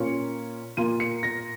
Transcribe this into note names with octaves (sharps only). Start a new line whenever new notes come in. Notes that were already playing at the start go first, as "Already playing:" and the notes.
Already playing: A#2 A#3 C#4 F4 C#7
A#2 A#3 F4 D#7
C#7
A#6